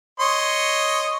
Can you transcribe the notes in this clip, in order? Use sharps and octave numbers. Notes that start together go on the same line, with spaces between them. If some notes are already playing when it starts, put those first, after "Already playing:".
C#5 D#5 C6